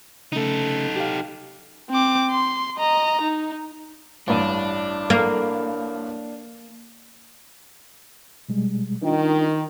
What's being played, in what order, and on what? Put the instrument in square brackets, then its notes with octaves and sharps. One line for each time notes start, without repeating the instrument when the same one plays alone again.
[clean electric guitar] C#3 A3 [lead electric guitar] D#4 A4
[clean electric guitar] G4 F5
[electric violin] C4 D6
C6
D#5 A#5
D#4
[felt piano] A1 G2 D#7 [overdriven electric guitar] D4
[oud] A#3
[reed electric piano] B2 G3 G#3
[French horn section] D#3 [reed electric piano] D4 F4